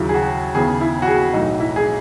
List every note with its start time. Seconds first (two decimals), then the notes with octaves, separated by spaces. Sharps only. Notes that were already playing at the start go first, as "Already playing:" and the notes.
Already playing: D#2 C#3 F#3 E4
0.09 G#4
0.14 F#4
0.55 D#2 C#3 E3 B3 G#4
0.81 E4
1.02 F#4
1.07 G#4
1.33 B1 A2 E3 D#4
1.60 E4
1.76 G#4